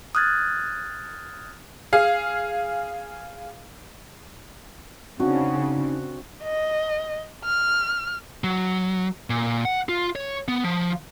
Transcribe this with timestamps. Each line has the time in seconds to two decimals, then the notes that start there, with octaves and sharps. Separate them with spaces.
0.15 D#6 F6 F#6 G#6 A6
1.93 G#4 F5
5.20 C#3 C4 D4 D#4 F#4
6.43 D#5
7.45 F6
8.44 F#3
9.30 A#2
9.65 F#5
9.89 F4
10.16 C#5
10.48 B3
10.64 F3